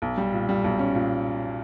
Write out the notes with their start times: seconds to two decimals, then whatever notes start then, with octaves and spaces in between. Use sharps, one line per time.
0.02 B1
0.18 G3
0.33 A#2
0.49 G3
0.64 B1
0.79 C#4
0.95 A#2